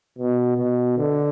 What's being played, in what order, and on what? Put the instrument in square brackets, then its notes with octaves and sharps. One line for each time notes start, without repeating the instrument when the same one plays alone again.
[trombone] B2
B2
D3